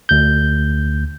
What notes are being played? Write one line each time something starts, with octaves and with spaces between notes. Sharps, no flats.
D2 G6